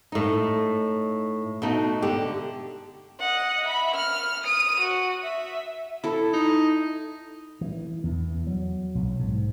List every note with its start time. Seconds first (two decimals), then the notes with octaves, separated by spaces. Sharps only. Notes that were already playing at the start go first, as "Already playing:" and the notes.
0.12 A2 D#4
1.62 B2 A3 D#4
2.02 D3 G4
3.20 D#5 F#5
3.65 E5 B5
3.95 F6
4.43 D#6 D#7
4.80 F#4
5.22 E5
6.04 E4 A4
6.33 D#4
7.61 E3
8.04 E2
8.47 F#3
8.95 B1
9.20 G#2